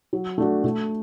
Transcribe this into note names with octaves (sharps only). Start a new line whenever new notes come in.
F#3
A3 D4 F#4
A3